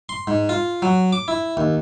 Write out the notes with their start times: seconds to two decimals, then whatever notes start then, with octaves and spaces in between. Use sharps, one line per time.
0.09 C6
0.27 G#2
0.49 F4
0.82 F#3
1.13 D6
1.28 E4
1.57 D#2